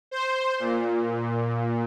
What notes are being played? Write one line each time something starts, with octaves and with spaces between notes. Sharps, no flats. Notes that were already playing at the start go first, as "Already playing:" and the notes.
C5
A#2